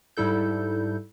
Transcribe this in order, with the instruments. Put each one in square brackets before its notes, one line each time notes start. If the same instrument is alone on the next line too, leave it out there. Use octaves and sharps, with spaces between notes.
[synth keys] G#2 G3 E4 A4 G6